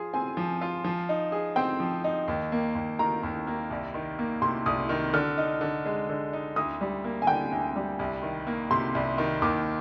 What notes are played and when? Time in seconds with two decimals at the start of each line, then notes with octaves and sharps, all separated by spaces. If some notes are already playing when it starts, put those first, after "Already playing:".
Already playing: F3 F4 G#4
0.14 C4 G#5
0.37 F3
0.61 F4
0.84 F3
1.09 D#4
1.32 G#4
1.56 C4 G5
1.80 F3
2.04 D#4
2.28 D#2
2.52 A#3
2.75 D#2
2.99 D#3 A#5
3.23 D#2
3.47 A#3
3.70 C2
3.94 D#3
4.19 A#3
4.42 C3 C6
4.66 C2 D#6
4.89 D#3
5.14 D3 F6
5.38 D#4
5.61 D3
5.85 G#3
6.09 D3
6.33 D#4
6.56 D2 D#6
6.81 G3
7.04 A#3
7.22 G#5
7.27 D3 G5
7.52 D2
7.76 G3
7.99 C2
8.23 D#3
8.47 A#3
8.71 C3 C6
8.95 C2
9.18 D#3
9.42 D#2 D6